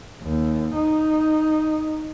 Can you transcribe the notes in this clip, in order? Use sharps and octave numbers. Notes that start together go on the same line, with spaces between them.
D#2
D#4